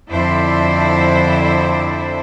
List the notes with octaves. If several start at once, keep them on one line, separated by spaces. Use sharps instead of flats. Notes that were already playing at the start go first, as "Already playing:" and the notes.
F2 D3 E4 A4 C5 D5